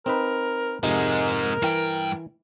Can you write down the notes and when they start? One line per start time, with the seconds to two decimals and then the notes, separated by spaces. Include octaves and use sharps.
0.06 C4 D#4 A#4 B4
0.83 F2 G#2 C3 G#3 D#4 A#4
1.62 G2 E3 G5